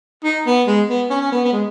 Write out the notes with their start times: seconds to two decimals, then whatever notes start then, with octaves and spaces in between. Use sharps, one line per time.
0.24 D#4
0.46 B3
0.67 G#3
0.89 B3
1.10 C#4
1.21 C#4
1.32 B3
1.45 B3
1.53 G#3